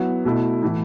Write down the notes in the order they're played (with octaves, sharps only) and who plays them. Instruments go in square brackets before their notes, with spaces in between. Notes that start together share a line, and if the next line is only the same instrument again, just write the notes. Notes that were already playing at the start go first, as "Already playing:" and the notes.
Already playing: [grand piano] F#3 B3 E4
B2 A3 E4
A2 E3 A3 E4